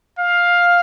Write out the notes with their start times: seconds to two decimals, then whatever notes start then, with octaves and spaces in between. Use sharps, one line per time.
0.19 F5